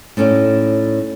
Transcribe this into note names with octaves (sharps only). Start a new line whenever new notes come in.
A2 A3 C#4 D#4 D5